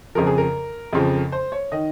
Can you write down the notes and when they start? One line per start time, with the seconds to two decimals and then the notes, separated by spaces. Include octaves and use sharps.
0.15 F2 C#3 F3 A#4
0.27 G#4
0.38 A#4
0.93 F2 C#3 F3
1.32 C5
1.52 C#5
1.72 D#3 D#5